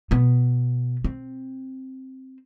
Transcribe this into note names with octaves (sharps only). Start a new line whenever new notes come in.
B2 B3
C4